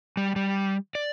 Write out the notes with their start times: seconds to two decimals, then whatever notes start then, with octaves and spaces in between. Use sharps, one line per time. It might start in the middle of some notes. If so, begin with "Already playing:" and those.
0.17 G3
0.36 G3
0.95 D5